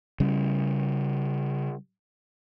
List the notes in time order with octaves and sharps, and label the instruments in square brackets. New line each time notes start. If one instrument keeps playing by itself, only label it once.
[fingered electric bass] C#3 G3